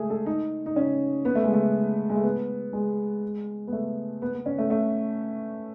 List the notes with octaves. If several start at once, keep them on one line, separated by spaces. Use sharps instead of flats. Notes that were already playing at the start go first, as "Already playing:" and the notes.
Already playing: G#3 A3 G#4
A4
D#4
D#4
C#4
B3
A3
G#3
A3
G#3
A3
B3
G#3
B3
A3
B3
B3
C#4
A3
A3